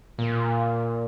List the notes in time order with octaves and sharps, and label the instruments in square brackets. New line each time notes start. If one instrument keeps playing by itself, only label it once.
[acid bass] A#2